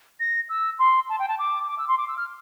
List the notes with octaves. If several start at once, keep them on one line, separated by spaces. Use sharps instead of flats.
A#6
E6
C6
A5
G5
A5
D6
D6
E6
C6
D6
E6
F6